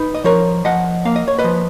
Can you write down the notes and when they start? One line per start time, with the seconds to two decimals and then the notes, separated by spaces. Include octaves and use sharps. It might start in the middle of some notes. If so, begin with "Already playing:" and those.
Already playing: D#4 B4
0.14 D#5
0.24 F3 A#4 C#5
0.65 F3 D#5 F#5
1.05 A#3 F5
1.16 D#5
1.28 C#5
1.39 B4 D#5
1.44 F3